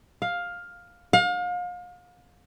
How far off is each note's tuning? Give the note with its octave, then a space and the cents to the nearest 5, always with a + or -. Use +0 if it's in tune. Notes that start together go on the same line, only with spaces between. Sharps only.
F5 +10
F5 +35